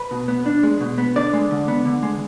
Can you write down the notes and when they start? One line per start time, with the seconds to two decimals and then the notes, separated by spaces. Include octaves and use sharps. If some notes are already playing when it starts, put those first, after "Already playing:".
Already playing: B4
0.11 B2
0.28 B3
0.46 D4
0.63 G#3
0.81 B2
0.98 B3
1.16 D3 D5
1.33 G#3
1.51 D3
1.68 B3
1.85 D3
2.03 G#3